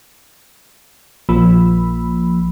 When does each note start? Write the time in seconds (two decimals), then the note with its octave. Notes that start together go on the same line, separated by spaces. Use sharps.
1.29 A#1 F3 A#3 B5 E6